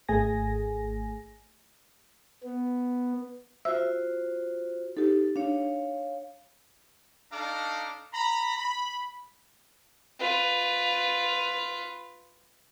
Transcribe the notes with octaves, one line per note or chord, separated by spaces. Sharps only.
G#1 A3 G#4 G#5 A#6
B3
F4 F#4 C5 E5 E6
D#4 G4 A4
D4 C#5 F5
D4 D#4 A4 F5 A#5 D6
A#5 B5
B5
F4 B4